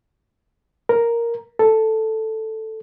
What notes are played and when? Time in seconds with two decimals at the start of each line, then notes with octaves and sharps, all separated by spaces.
0.89 A#4
1.59 A4